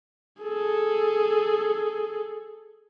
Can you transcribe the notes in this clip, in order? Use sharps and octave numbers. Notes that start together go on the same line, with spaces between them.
G#4 A4